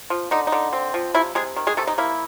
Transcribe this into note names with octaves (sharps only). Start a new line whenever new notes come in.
F3
D3 D#4
D#4
D3
C4
F3
C3 E4
C3 G#3 G#4
D#3
G#3 G#4
C3 A3 A4
D#4
A#3 E4